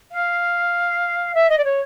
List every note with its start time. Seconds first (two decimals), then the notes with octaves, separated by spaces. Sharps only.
0.12 F5
1.34 E5
1.49 D#5
1.58 D5
1.64 C#5